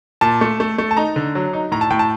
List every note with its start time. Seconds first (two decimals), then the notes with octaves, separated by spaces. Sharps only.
0.21 A#2 A5
0.41 A3
0.60 A3
0.78 A3
0.91 A5
0.97 D#4 A#5
1.16 D3
1.35 F#3
1.53 D#4
1.72 A2 A#5
1.81 A5
1.90 A2 G5
1.99 A5